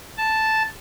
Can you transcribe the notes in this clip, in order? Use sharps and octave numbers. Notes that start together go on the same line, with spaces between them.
A5